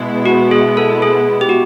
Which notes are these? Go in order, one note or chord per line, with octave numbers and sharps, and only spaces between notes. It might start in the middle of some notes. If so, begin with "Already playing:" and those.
Already playing: B2 G#3 B3 E4
F#4
G#4
A4
G#4
G4
F#4